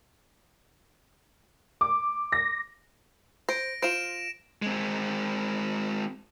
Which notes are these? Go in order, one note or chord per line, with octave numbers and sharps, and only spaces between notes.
D6
A#6
C5 A#6 D7
F4 C5 D7 E7
G#3 C4